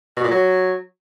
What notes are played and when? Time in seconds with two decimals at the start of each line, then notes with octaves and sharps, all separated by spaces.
0.17 B2
0.24 A#2
0.31 F#3